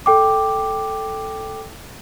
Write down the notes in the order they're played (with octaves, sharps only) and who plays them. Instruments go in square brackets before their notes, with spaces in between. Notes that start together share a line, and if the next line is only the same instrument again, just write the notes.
[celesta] A4 G5 D6